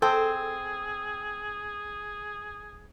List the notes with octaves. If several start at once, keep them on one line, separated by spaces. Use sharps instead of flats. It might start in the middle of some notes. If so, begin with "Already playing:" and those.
C4 G#4 A4 G5 E6